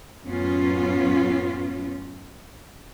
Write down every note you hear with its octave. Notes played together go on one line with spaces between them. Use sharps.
F#2 A2 F#3 B3 C#4 F4